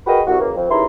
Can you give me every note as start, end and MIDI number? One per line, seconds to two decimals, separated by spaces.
0.06 0.20 66
0.06 0.20 68
0.06 0.20 70
0.06 0.20 71
0.06 0.20 75
0.06 0.20 79
0.27 0.36 36
0.27 0.36 66
0.39 0.49 42
0.39 0.49 49
0.39 0.49 52
0.39 0.49 58
0.55 0.66 41
0.69 0.84 39
0.69 0.84 49
0.69 0.84 52
0.69 0.84 64
0.69 0.84 82
0.69 0.84 84